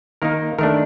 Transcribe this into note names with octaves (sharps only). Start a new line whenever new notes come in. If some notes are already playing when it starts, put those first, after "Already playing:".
D#3 A#3 D#4 A#4
D#3 A3 D4 A#4